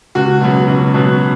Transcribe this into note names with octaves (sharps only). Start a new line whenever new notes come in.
C#2 F#4
B2 F#3 B3
C#2
B2 F#3 B3